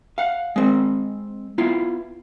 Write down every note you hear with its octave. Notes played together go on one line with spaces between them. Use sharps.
F5 F#5
G#3 C4
B3 E4 F4